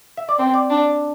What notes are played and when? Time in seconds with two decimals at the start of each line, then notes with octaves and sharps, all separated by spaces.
0.17 E5
0.29 D5
0.38 C4 C5
0.54 D5
0.70 D4